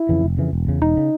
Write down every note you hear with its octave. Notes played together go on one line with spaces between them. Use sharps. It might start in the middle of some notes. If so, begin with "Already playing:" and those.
Already playing: E4
F2 C#3 E3
F1
F2 C#3 E3
E1
E2 C#3
E1 D#4
C#3